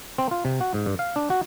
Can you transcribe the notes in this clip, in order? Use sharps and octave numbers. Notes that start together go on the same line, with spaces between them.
C4
F4
C3
F#4
G#2
G2
F5
D4
F#4